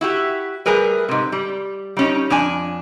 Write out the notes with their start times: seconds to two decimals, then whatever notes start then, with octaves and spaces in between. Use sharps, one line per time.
0.01 E4 F#4 G4
0.66 G3 A3 G#4 A#4 B4
1.09 G#2 C3
1.32 G3
1.97 G3 C#4 D#4
2.30 F2 D4 G#5